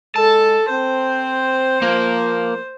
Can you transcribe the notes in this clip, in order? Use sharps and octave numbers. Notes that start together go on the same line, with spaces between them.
G#3 A4 A5
C4 C5
F3 A#3